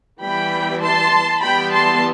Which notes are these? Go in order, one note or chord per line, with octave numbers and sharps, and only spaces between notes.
E3 G3 B3 G5 B5
A5 C6
E3 G3 B3 G5 B5
A5 C6